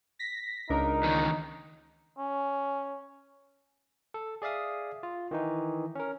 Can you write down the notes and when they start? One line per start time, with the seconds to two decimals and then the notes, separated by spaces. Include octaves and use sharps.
0.19 A#6 B6
0.70 C#2 D4 D#4 A#4
1.03 E2 D#3
2.19 C#4
4.14 A4
4.42 G#4 D5 E5 F5 D#6
5.03 F4
5.31 D#3 E3 D#4
5.95 C#4 A#4